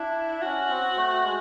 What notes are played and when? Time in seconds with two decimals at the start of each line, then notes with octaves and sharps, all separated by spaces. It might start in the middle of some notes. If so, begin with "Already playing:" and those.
Already playing: D4 E4
0.42 C#4 F#4
0.70 C4
0.96 A3
1.24 G#3